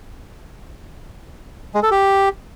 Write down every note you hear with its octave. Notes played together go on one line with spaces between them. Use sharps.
G#3
A4
G4